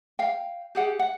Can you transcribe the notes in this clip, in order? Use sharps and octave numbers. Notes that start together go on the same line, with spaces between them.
F5 G5
G4 G#4 F#5
F#5